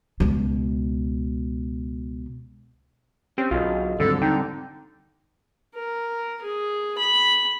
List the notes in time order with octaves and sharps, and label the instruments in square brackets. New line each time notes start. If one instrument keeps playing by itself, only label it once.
[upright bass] C#2 B2
[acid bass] C4 [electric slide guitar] C#4 [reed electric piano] G4
[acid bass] B1 [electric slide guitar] D3 F#3 [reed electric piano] F4 G#4 D#5
[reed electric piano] D#2 G#2 F#3 [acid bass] D3 [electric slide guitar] G3 C4 [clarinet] A4
[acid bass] D3 [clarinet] D#4 [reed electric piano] G5
[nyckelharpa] A#4
G#4
B5